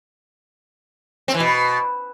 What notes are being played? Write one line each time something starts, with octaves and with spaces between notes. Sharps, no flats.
C4
E3
B2